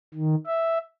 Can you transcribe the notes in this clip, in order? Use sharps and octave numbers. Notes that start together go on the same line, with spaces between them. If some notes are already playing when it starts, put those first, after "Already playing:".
D#3
E5